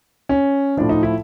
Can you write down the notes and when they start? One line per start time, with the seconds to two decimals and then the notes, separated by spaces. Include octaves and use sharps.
0.29 C#4
0.77 A2 F3 D4
0.89 D#4
1.03 E4